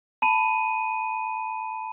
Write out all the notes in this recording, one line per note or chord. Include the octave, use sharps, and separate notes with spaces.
A5 B5 D#7